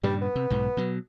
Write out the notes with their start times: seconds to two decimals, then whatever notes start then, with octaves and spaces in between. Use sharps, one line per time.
0.03 G2 A#2 C#3 G3
0.21 B3
0.35 C3
0.50 B1 G#2 B2
0.77 B2 F#3